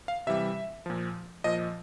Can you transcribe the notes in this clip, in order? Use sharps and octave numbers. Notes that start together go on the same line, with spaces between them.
F5
C3 E3 G3 E5
A#2 F3
A#2 F3 D#5